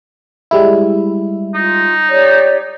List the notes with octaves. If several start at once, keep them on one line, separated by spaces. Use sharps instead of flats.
G3 G#3 E4
D#4 F4
G4 C#5 D5